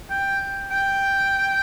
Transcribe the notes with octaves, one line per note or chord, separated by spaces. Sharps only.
G5
G5